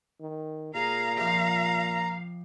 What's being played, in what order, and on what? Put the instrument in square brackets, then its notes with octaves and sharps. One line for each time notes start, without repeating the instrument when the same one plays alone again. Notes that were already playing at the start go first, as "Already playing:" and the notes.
[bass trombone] D#3
[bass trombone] A#2 [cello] G#4 F5 [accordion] A#5
[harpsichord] F2 C3 [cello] F5